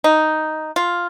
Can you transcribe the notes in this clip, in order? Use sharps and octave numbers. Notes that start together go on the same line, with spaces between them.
D#4
F4